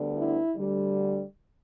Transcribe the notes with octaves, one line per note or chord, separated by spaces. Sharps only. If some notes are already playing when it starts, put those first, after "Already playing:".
Already playing: D2 D3 G3 B3
E4
D2 D3 G3